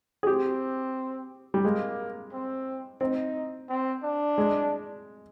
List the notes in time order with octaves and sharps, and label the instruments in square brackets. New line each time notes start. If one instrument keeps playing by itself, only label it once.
[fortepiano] G#4
[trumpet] C4 [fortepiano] G4
[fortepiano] G3
[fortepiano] G#3 [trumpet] A#3
[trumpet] C4
[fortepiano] C4 [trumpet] D#4
[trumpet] C4
D4
[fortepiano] G#3